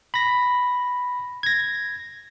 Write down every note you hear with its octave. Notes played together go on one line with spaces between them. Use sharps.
B5 A#6
G#6 A#6